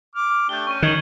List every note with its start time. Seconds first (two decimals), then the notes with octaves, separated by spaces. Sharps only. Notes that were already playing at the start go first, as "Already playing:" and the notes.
0.15 D6 F6
0.49 A3 D4 G4 G6 G7
0.67 C#4 C#6 D#7
0.82 D#3 F#6 G#6 F#7